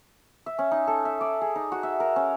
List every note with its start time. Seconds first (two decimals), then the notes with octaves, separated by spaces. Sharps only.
0.46 E5
0.59 C#4
0.71 D#4
0.87 A4
1.05 E5
1.21 D5
1.41 G#4
1.55 D#4
1.72 F#4
1.83 E5
2.00 A#4
2.16 C#4